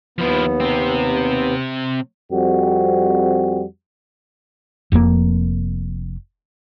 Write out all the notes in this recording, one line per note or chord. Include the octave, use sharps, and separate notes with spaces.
D#2 F3 B3 E4
C3 C4
F2 G3 C4 F#4
F1 F2 A2 A#3